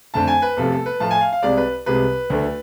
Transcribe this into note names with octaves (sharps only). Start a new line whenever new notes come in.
F2 D3 A3 A5
G#5
B4
E2 C3 F3 A3 A4
A4
B4
A2 F3 A3 A5
G#5
F5
F5
C2 C3 G#3 D5
B4
C2 C3 G#3 B4
D2 D3 A3